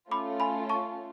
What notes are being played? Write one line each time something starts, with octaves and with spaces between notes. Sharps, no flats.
A3 C#4 F4 B5 D6
G#5 B5
A5 C#6